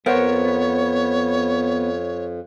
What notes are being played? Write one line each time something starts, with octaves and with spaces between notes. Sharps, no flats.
F2 B3 A#4 C5 C#5 F#5